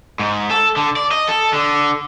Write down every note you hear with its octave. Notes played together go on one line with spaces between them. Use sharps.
G#2
A4
D3
D5
D#5
A4
D3